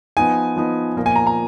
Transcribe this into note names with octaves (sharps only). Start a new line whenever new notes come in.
F3 B3 D#4 G#5
F3 B3 D#4
A#2 F3 A#3
G#5
A#5
A#5